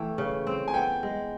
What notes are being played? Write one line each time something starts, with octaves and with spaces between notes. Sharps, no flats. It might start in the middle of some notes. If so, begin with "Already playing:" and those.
Already playing: E3 A3 G5
C#3
C4
G#5
B3 G5
G#3